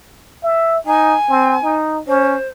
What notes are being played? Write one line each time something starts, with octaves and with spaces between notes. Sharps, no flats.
E5
D#4 G#5
C4
D#4
C#4 C5